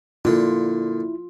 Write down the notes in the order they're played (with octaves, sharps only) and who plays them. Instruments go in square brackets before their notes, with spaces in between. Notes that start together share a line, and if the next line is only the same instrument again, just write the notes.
[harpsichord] A#2 D3 [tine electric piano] E4 [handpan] F4